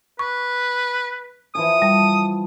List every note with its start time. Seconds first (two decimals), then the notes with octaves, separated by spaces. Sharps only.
0.19 B4 C#6
1.55 E3 F3 G#5 D#6
1.82 G3 A5